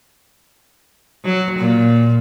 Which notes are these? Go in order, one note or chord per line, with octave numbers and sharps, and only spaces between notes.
F#3
A#2